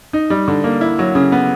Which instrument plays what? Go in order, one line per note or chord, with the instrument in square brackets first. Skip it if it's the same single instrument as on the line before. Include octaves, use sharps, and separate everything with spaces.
[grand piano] D#4
G3
D3
A#3
E4
F#3
C#3
B3